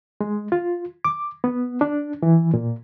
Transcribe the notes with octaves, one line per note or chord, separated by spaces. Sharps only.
G#3
F4
D6
B3
D4
E3
A#2